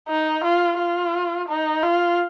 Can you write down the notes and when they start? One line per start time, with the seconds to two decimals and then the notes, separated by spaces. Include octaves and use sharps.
0.09 D#4
0.44 F4
0.79 F4
1.49 D#4
1.83 F4